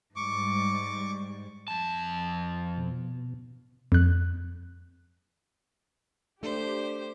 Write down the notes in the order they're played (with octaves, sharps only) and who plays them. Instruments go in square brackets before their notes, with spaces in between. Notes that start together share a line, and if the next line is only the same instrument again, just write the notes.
[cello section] G#2 G3 [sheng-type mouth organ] C#6 D6
[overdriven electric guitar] F2 A5
[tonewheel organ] B2
[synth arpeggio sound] F2 F#6
[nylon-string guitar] A3 [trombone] D4 [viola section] G4 [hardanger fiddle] C5